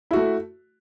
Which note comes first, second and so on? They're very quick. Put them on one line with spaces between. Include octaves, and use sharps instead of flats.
E4 F#4 A3